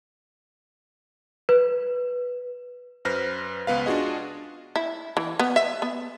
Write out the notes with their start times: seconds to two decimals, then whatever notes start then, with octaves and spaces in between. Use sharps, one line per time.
1.49 B4
3.05 F#2 B4 C5 F6 A#6
3.67 C#2 B3 B4 F5
3.86 D4 F4 F#4 G#4 D#5
4.76 E4
5.17 E3
5.39 B3
5.56 E5
5.82 B3